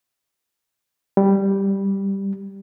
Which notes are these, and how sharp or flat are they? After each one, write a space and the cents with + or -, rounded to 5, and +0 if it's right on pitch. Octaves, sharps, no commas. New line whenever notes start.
G3 +0